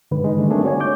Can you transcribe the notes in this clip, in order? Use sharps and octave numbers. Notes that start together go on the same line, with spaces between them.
G2 D3 D#3 G#3 B4
G#3 D#4
D3 G3 A3 D4 G#4
A3 C4 D4 D#4 G#4 A#4
F#4 C#5 D5 G#5
D6 G6